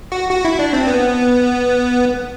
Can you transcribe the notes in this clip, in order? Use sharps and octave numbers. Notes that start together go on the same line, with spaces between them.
F#4
F#4
E4
D4
C4
B3